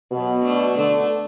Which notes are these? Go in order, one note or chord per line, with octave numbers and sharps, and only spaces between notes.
B2 F#3 B3
A3 D4
D3 A3 D4